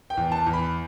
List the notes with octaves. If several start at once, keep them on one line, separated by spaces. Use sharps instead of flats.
G5
E2
A5
E2
B5